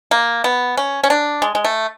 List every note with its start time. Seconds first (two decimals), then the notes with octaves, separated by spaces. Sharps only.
0.11 A#3
0.44 B3
0.77 C#4
1.03 C#4
1.10 D4
1.42 G#3
1.55 G#3
1.64 A3